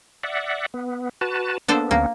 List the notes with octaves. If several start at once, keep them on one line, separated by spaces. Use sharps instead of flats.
D5 E5 F#5
B3
F#4 B4 A5
A#3 B3 D4 A4 C5
D2 A#3 B3 C#4